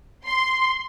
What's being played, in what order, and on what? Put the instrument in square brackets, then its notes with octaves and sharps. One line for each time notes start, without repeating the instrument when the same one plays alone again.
[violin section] C6